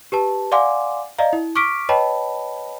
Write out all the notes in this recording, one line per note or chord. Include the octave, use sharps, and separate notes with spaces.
G4 B4 A5
D5 F5 F#5 G#5 C6 D6
D5 D#5 F5 A#5
E4
C#6 D6 F6 B6 D7
B4 C#5 D#5 G5 A5 B5